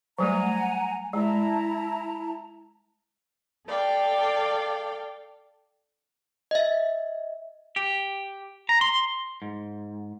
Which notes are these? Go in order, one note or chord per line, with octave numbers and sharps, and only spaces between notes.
F#3 G3 A3 F#5 G#5 A#5
G#3 E4 A5 A#5
A4 D5 F5 G5
D#5 E5
G4
A#5
C6
G#2